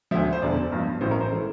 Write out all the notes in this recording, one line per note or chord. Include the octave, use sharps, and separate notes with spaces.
D2 D3 F3 E5
C5
E1 E2 D3 D5
G1 G2 F3
A1 A2 E3 C5
A#4
C5
E3 A3